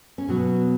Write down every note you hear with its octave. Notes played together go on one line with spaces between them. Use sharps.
C#4
B2 F#3 B3